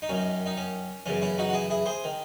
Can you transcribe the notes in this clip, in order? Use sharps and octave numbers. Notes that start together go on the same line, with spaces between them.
D#4
F#2 D#3 C#4
D#4
C#4
F#2 C#3 E3 C#4
C#4 E4
D#4 F#4
F#4
E4 G#4
E4 G#4
G#4 C5
D#3